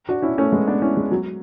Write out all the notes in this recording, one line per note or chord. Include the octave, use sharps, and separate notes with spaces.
D4 F#4
C#4 E4
A3 C#4
G#3 B3
B3 D4
C#4 E4
G#3
F#3